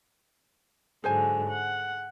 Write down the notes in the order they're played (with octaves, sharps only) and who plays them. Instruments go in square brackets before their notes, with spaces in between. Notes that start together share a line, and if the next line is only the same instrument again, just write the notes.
[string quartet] G#2 D3 F#3 [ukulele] G#4 C5 G#5
[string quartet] F#5